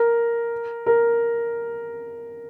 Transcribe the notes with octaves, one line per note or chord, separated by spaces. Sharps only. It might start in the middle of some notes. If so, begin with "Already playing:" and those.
Already playing: A#4
A#4